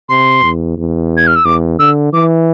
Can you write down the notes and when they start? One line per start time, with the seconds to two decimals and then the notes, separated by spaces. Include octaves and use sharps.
0.09 C3 C6
0.43 E2
0.77 E2
1.17 G#6
1.27 F6
1.36 E6
1.45 E2 D6
1.79 D3 E6
2.13 E3 D6